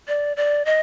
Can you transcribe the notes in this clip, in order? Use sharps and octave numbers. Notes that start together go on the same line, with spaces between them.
D5
D5
D#5